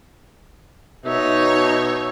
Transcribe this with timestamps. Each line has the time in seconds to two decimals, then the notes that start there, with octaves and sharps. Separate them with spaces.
1.05 B2 D#4 C#5 E5